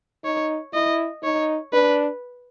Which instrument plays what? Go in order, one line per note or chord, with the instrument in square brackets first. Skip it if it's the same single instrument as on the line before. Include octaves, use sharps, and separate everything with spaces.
[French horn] D#4 [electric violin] C#5
[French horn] E4 [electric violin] D#5
[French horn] D#4 [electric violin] C#5
[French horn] D4 [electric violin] B4